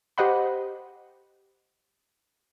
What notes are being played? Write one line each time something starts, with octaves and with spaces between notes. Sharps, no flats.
G4 C5 D#5 F#5 B5